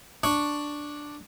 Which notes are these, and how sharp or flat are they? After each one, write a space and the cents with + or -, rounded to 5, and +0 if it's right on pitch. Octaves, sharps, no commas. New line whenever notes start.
D4 +0 C#6 +0